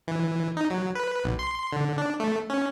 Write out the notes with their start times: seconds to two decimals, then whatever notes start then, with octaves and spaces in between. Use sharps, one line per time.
0.08 E3
0.57 D#4
0.70 F#3
0.95 B4
1.24 B1
1.39 C6
1.73 D3
1.98 D4
2.20 A3
2.50 C#4